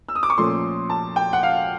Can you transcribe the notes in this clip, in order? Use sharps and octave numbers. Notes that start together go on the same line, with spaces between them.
E6
D#6
D6
C#6
A#2 F3 A3 C#4 C6
A5
G5
F#5
F5